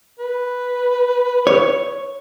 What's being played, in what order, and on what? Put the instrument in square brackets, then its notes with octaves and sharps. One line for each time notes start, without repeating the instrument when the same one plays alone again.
[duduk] B4
[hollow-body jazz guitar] C#5